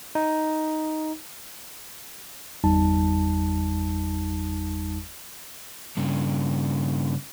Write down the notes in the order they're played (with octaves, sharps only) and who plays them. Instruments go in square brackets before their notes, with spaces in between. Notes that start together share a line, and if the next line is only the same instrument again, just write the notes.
[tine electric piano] D#4
G1 E2 G3 D#4 A5
[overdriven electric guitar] G2 C#3